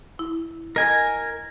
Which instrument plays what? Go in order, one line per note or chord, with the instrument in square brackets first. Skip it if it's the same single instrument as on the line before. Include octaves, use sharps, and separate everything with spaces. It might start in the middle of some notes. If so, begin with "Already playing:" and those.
[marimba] E4
[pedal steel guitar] A#4 G#5 [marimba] D#5